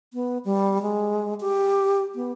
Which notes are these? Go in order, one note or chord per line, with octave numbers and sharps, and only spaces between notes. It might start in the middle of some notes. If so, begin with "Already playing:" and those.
B3
G3
G#3
G4
B3